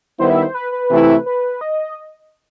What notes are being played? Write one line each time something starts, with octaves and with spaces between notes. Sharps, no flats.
D#3 G3 B3 E4 C5
E5
C5
B4
B4
C3 E3 A3 E4
B4
D#5